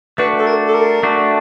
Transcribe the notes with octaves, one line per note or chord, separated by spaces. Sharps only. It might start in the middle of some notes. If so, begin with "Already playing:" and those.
A3 D4 F#4 B4
A4
A#4
A4
A#4
A3 D4 F#4